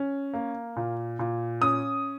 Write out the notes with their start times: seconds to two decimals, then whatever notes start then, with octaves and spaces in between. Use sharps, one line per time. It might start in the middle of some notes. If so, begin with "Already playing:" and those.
Already playing: C#4
0.34 A#3
0.76 A#2
1.19 A#2
1.61 C#4 D#6